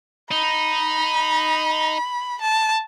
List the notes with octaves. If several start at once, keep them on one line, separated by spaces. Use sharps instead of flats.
D#4 B5
A5